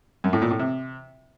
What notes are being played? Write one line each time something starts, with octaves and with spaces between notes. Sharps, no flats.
F#2
A2
A#2
A2
C3